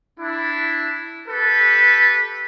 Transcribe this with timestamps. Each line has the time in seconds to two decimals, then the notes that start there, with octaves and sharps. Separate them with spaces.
0.20 D4 E4
1.27 G4 A4 B4